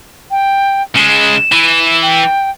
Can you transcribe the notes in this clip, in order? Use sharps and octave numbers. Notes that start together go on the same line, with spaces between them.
G5
C#3 G#3 E7
E3
G5